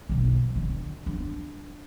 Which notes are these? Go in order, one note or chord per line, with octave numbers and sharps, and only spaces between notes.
B1 E3
D3
D4